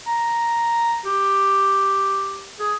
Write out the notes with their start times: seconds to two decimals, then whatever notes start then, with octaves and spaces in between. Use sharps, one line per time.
0.07 A#5
1.06 G4
2.60 G#4